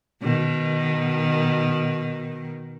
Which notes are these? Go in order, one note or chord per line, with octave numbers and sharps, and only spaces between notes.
B2 D#3